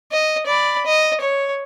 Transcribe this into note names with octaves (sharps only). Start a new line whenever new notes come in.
D#5
D5 B5
D#5
C#5